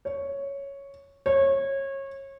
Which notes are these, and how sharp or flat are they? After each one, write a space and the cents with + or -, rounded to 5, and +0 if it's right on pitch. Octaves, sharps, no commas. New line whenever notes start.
C#5 +0
C#5 -25